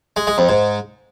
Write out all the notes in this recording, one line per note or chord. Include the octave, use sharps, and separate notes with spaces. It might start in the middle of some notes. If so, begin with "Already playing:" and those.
G#3
G#3
F2
G#2